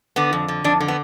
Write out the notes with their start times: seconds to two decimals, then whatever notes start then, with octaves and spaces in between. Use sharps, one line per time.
0.16 D3 B3
0.33 F2
0.48 D3
0.64 F2 D4
0.81 D3
0.88 B3